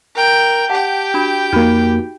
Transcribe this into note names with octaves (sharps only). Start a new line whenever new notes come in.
A#4 G5
G4 F#5 G5 A5
D4 F#4 B5
F2 A#3 D#4 F#4 B5